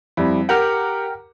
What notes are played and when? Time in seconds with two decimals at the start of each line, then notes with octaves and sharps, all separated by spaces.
0.17 F2 G3 E4
0.49 G4 A#4 F#5 G5 A#5 F6